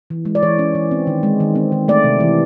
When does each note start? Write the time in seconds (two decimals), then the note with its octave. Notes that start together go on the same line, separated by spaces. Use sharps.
0.10 E3
0.25 G#3
0.35 D5
0.43 E3 C#5
0.59 C#4
0.75 E3
0.91 C4
1.07 D#3
1.23 G#3
1.40 D#3
1.55 C4
1.72 D#3
1.88 A3 D5
2.04 C3
2.20 E3